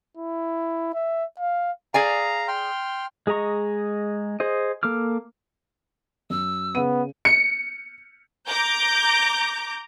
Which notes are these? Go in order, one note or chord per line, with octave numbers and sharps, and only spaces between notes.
E4
E5
F5
G#4 D5 F5 G#5 A#5
G5 C6 F6
G#3 G#4 D#5 A#5 C#6
G#4 C5 D#5
A#3 A4 D6 F6
F#2 E6
C#3 B3 D#7
C#7
A#5 D6 G6